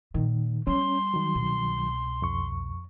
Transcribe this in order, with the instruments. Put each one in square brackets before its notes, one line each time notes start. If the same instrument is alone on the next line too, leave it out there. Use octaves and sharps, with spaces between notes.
[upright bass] A#2 [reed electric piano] D#3
[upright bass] G3 B3 [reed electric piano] C#4 [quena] C6
[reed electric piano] D#3 F#3
[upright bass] C2 B2
[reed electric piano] F2 C#6